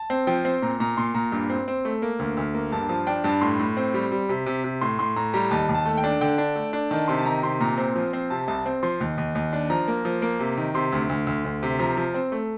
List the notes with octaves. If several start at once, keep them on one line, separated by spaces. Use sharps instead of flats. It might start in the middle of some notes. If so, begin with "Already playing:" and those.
Already playing: A5
C4
F3 G5
C4
A#2 A#5
A#2 A#5
A#2 C6
A#2 A#5
G2
C4
C4
A3
A#3
D2
D2
A#3
G2 A5
F3 A5
D4 G5
G2 A5
A2 C6
A2
C4
G3
G3
C3
C3
C3
A2 C6
A2 C6
A2 A#5
G3 A#5
D#2 A5
D#2
A5
A3
G5
D4
D3 G5
D4
A3
D4
D#3 A5
C3 C6
A5
D#3 A#5
C3 C6
A#2 A#5
C4
F3
C4
C3 A5
C2 A5
C4
F3 C6
D#2
D#2
D#2
D4
F3 A#5
A#3
F3
A#3
C3
D#3
C3 C6
D2
D2
D2
D2
C3
F3 A#5
F3
C4
A3